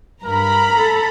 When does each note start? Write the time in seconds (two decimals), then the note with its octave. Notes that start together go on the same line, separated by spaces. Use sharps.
0.25 G2 A#4 A#5 B5
0.73 A4